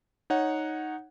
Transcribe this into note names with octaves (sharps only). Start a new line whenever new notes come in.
D#4 C#5 F#5